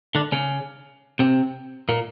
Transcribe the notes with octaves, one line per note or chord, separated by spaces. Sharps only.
D3 D4
C#3 C#4
C3 C4
A#2 A#3